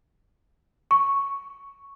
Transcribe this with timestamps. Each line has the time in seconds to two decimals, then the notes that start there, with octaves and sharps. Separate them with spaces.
0.91 C#6